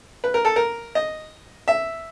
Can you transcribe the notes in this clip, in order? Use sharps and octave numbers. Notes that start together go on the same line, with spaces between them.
B4
A#4
A4
A#4
D#5
E5